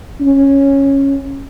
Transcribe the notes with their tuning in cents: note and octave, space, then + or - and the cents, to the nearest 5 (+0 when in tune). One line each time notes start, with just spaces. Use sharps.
C#4 -10